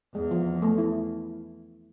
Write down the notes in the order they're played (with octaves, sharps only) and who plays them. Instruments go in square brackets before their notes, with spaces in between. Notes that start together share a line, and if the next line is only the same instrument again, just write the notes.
[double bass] E2 [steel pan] G#3
[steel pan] F3
A3
E4